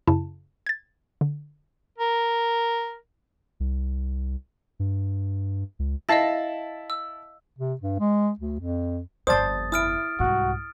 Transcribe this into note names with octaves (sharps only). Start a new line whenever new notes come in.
F#2 C#3 E4 A5
G#6 A6
D3
A#4
C2
G2
C#2
E4 D#5 F5 A5 A#6
E6
C3
G2
G#3
D2
F2
G1 F2 C5 D5 A5 D#6 A6
E4 D#6 F6 D7
C2 G#2 F#4